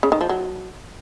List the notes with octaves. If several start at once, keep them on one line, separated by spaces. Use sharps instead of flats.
C#3
D#3
F3
F#3